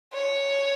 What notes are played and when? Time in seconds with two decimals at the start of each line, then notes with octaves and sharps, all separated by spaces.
0.14 C#5